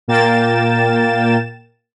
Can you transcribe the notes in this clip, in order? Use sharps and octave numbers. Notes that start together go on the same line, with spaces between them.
A#2 A#3 A#4 G5 A6 E7